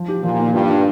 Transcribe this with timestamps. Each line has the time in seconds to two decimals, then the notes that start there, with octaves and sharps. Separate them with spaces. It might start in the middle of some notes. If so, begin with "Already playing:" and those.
Already playing: F3
0.08 G4
0.23 A#2 F3
0.39 A#3
0.54 G2 F4
0.69 F4